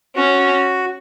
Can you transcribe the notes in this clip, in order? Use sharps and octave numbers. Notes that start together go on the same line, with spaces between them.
C#4 F#4